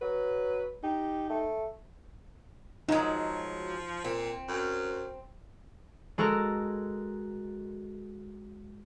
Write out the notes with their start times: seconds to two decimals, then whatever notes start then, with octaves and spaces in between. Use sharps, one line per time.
0.02 F#3 B4
0.84 D#4 G4
1.30 A3
2.89 F3 F#3 G#3 D#4
4.04 A#2 C4
4.48 F#2
6.18 G#3 F#4 A4 A#4